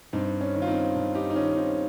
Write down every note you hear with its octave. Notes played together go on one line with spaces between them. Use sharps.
G2 C4 D#4
C#4
D#3
F4
C4 D#4
G2
D#4 G4
D#4
D#3 C#4 F4
C4 D#4